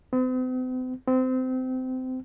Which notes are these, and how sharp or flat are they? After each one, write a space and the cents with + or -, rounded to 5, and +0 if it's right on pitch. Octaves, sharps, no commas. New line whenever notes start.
C4 -45
C4 -25